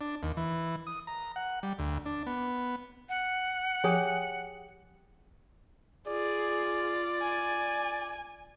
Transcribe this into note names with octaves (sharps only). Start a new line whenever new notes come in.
D4
D#2
E3
D#6
A#5
F#5
G3
D2
D4
B3
F#5
F3 G4 G#4 G#5
F4 G#4 D5
G#5